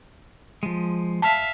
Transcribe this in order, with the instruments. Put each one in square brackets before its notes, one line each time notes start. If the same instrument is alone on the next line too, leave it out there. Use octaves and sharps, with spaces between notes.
[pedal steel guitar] F3 G#3
[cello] E5 F5 [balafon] A5